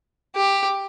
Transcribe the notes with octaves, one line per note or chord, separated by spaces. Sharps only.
G4